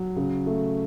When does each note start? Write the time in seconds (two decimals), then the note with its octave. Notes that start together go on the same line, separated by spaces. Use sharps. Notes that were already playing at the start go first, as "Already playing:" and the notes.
Already playing: F#3
0.16 C#3
0.46 A3